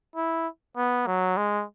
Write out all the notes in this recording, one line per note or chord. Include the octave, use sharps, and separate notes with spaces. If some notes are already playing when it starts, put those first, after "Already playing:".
E4
B3
F#3
G#3